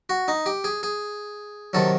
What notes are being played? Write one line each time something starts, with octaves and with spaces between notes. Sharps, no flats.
F#4
D#4
G4
G#4
G#4
C3 D#3 F#3 A4